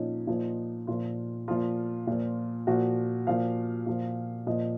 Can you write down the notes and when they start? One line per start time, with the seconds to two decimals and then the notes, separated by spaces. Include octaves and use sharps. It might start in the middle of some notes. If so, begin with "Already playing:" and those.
Already playing: A#2 F3 C#4 D#4
0.27 A#2 F3
0.87 A#2 F3 F4
1.48 A#2 F3 F4
2.07 A#2 F3
2.67 A#2 F3 F#4
3.27 A#2 F3 F5
3.87 A#2 F3
4.47 A#2 F3 D#5